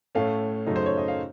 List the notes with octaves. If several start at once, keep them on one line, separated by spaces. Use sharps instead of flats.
A2 A3 C#4 F5
F#2 C#3 A3 D#4
C5
C#5
D#5
F5